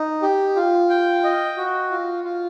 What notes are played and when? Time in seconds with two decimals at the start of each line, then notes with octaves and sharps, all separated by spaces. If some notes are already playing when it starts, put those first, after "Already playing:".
Already playing: D#4
0.22 G4
0.56 F4
0.90 G5
1.24 D#5
1.57 F#4
1.91 F4
2.24 F4